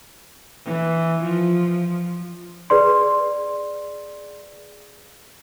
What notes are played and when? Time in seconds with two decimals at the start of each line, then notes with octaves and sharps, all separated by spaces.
0.66 E3
1.23 F3
2.70 G#4 B4 D5 C6